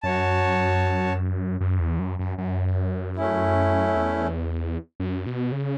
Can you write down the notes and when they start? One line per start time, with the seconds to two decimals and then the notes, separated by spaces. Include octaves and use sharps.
0.03 F#2 F#4 C#5 A5
1.61 F#2
1.80 E2
1.99 F#2
2.19 F#2
2.38 F#2
3.16 A3 C#4 E4
3.95 E2
5.00 F#2
5.26 B2
5.52 C#3